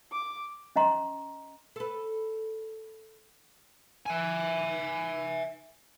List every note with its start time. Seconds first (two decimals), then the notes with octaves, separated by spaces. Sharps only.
0.12 D6
0.76 C#4 D#5 A#5 C6
1.76 A4 B4
4.06 E5 G#5